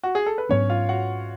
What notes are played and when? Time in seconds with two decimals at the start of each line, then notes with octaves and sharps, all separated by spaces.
0.03 F#4
0.15 G#4
0.26 A4
0.38 B4
0.49 G#2 F#3 B3 C#4 D4 C#5
0.70 F4 F5
0.89 F#4 F#5